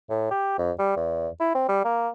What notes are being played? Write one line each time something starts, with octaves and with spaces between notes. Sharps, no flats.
A2
G4
F2
G3
E2
E4
C4
G3
A#3